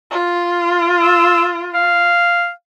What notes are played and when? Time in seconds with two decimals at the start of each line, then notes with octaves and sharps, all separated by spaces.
0.11 F4
1.03 E6
1.75 F5